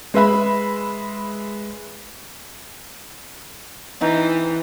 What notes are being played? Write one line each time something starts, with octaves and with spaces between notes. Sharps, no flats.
G#3 B4 E5 B5
E3 C4 D#4